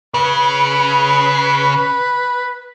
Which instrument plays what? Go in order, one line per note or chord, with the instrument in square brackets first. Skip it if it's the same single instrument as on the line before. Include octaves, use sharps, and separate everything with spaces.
[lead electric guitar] C#3 [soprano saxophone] B4